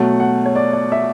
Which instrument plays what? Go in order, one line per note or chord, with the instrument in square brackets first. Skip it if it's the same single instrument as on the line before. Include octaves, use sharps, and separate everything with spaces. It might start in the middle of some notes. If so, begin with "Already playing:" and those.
Already playing: [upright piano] B2 F#3 A3 F#5
F#5
C#5
D5
D5
E5